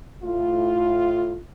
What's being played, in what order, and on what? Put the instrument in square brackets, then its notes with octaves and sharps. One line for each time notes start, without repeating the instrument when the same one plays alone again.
[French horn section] A2 F4